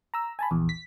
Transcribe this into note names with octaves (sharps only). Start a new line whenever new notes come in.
A#5 E6
G#5 A5 B5
A#1 E2
B6